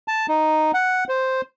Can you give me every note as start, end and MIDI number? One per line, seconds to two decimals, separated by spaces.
0.08 0.26 81
0.28 0.71 63
0.74 1.04 78
1.09 1.41 72